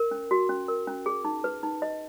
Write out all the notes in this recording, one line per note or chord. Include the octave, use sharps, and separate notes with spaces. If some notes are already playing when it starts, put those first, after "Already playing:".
Already playing: A#4
C#4
F#4
C#4
A#4
C#4
G#4
D#4
B4
D#4
D#5